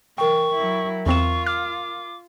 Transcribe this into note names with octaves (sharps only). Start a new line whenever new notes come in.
E3 A#4 G5 C#6
F#3 E4
E2 C4 F4 C#6 E7
D6 F6